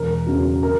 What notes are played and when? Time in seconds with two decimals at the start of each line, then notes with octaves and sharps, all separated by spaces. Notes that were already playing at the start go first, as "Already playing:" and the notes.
Already playing: E1 A#4
0.26 E2 C#3 F#3
0.63 A#4